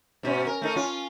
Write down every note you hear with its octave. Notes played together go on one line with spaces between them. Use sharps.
G#2 B2 C#4
A#4
A3 D#4 A#4
C#4 F4